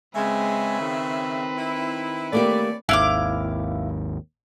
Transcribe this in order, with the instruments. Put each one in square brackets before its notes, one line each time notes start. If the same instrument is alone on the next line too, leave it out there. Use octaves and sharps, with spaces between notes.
[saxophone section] C#3 E5 [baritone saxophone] G#3 [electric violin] C4 B4
[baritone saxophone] D#3
[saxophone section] E4
[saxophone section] E3 C#5 D5 [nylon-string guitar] A3 A#3 G4
[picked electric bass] G#1 D#2 [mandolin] E4 F5 D6